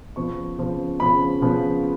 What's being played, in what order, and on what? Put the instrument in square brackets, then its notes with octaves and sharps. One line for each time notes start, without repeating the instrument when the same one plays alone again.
[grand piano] C#3 F3 B3 C#6
C#3 F3 B3
C#3 F3 B3 B5
C#3 F3 B3